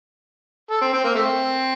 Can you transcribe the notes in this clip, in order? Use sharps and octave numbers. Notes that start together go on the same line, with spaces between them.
A4
C4
C4
A#3
A3 C4